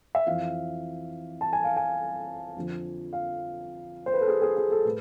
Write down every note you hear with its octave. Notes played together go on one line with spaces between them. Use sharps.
E5
F2 E3 F5
A5
G#5
F5
G#5
F2 D3 F3
F5
C5
B4
A4
G#4
G#4
G#4
A4
A2 B4